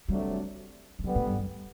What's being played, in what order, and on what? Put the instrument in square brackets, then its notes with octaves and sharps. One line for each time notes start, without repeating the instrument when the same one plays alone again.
[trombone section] D2 C3 F#3 A3 D4 [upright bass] G3
[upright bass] E3
[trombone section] D3 G3 B3 [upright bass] F#3
[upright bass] A2
G2
F#2